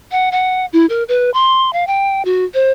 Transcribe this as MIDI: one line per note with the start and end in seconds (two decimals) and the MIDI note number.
0.12 0.31 78
0.32 0.66 78
0.73 0.86 64
0.89 1.04 70
1.08 1.30 71
1.34 1.73 84
1.73 1.87 77
1.87 2.25 79
2.25 2.44 66
2.54 2.71 72